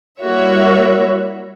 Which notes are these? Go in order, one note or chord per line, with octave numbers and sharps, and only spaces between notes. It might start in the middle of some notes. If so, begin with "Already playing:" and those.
G3 A#3 E4 F#4 C#5 E5